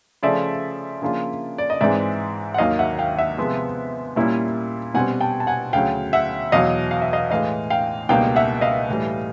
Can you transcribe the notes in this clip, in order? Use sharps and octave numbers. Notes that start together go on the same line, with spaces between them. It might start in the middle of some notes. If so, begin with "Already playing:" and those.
C#3 F3 A3 D5 E5
C#3 F3 A#3 D4 F4
D5
D#5
G#2 E3 G#3 C4 D5 E5
F#5
D#2 D#3 F#3 A#3 D#5 F5
E5 F#5
F5 G5
E5 F#5
C3 F3 G#3 B3
A#2 G3 A#3 C#4 E4
B2 G3 C4 F#5 G#5
G5 A5
A5
F#5 G#5
D2 C#3 F#3 F5 G5
E5 F#5
E2 B2 F#3 D#5 F5
F5
E5
D#5 F5
A2 E3 G#3 D#5 F5
F5 G5
C#2 B2 G3 A#3 D#4 F5 G5
E5 F#5
D#5 F5
A2 E3 G3